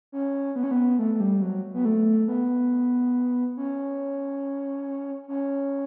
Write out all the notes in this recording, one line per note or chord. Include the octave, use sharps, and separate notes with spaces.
C#4
B3
C#4
B3
A3
A3
G3
F#3
B3
A3
B3
C#4
C#4